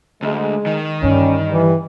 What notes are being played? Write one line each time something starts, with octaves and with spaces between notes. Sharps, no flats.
D2 G#3
D#3
G2 D3 G3 C#4
E3 G3